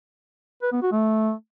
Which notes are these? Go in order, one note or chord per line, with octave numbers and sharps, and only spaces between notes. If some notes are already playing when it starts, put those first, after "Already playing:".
B4
B3
F#4
A3